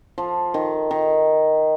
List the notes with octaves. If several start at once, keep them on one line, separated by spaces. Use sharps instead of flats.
F3
D#3
D#3